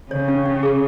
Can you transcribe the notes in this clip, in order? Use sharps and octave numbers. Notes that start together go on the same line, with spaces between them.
C#3 C#5
C#4
C#4
G#4